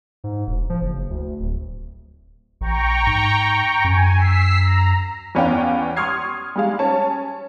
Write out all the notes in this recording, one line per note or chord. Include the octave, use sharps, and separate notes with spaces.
G#2
E1
F3
F#1
D2
D1
A#1 G5 A#5 C#6
G#2
F#2 G#5
E6 B6 C7
A#5
E2 B3 C#4 D5 F5 G5
C6 C#6 D#6 F6 G#6 C7
G3 G#3 F5
C#4 C#5 A5